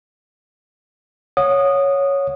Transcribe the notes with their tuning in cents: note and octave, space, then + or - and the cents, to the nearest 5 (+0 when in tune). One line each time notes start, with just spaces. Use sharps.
C#5 +0 F#5 -40 D#6 -15